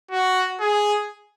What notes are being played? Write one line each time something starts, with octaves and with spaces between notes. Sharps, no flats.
F#4
G#4